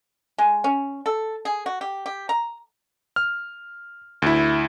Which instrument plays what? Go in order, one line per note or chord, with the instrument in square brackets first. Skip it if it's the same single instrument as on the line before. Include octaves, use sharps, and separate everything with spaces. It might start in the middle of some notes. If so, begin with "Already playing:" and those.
[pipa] G#3
C#4
A4
G#4
F#4
G4
G4
A#5
[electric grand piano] F6
D2 E4